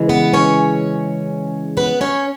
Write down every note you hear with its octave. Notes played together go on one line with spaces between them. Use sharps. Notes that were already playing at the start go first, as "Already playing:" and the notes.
Already playing: C#3 E3 G#3
B3 B4
C#4 C#5
B3 B4
C#4 C#5